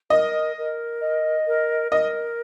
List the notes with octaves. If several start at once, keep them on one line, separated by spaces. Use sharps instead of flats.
A#4 D#5
A#4
D#5
A#4
A#4 D#5